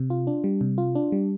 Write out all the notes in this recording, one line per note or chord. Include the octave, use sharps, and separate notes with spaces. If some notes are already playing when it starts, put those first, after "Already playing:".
Already playing: C3
F4
D4
G3
C3
F4
D4
G3